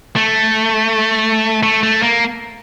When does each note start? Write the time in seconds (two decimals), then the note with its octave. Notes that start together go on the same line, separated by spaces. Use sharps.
0.16 A3
1.63 A3
1.83 A3
2.03 A#3